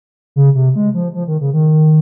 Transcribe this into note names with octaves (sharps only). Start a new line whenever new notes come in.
C#3
C3
G#3
F3
F3
D#3
C#3
D#3